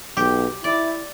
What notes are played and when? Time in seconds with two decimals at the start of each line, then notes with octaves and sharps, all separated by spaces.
0.17 B1 G4
0.64 E4 D5